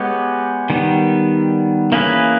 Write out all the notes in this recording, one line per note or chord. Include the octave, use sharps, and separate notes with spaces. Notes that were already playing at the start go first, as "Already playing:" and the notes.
Already playing: G#3 B3 G4 C#5
D#3 G3 B3
E3 A#3 C#4 G#4 B4